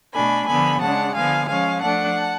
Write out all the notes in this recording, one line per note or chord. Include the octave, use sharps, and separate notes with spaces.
B2 A3 D4 G#5 B5
D3 F3 B3 G#5 B5
C#3 G#3 D4 F#5 A5
D3 F3 B3 F5 G#5
F3 G#3 C#4 F5 G#5
F3 A3 D4 F#5 A5